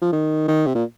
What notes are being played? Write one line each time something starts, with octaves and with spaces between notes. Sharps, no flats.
F3
D#3
D#3
C3
A#2